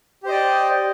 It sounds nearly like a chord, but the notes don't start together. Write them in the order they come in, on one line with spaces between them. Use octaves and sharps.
G4 C5 D#5 D5